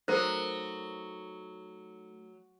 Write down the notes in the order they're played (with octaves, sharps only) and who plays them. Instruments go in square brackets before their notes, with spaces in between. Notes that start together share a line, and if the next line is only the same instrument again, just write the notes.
[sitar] F#3 [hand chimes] A3 D#4 [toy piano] A#4 C5